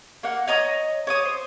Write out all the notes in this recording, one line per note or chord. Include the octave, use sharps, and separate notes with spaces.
A#3 F#5
C#5 D#5 A#5 D#6
C#5 D6 D#6
C5